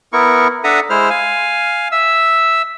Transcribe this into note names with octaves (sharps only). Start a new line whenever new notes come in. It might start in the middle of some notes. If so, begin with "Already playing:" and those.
B3 E4 A#4 C#6
D4 A4 E5 F#5 A#5 D#6
G#3 E4 C5 F6
F5 G#5
E5 E6